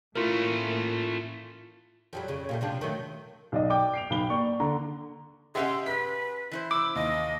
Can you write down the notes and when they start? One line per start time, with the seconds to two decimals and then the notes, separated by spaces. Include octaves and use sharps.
0.16 A2 A3 A#3 C#4 E4 F4 A#4
2.13 F2 F#3 G3
2.28 F2 C#3
2.49 A#2 G3 A3
2.61 C3 F3 D4
2.81 D#3 F#3 A3
3.52 B1 D5 D#5
3.70 G5 D6
3.94 C7 D7 F7
4.10 B1 B5 G7
4.29 A#3 D5 C#6
4.60 D3 A#5
5.55 C#4 G4 G#4 D#5 E5 F#5 C6
5.86 B4 B6
6.51 E3 E4 C5
6.71 B5 D6 E6 D7
6.95 D#2 D#5